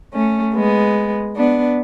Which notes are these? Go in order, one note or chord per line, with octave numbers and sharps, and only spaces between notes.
A3 C#4
G#3 B3
B3 D4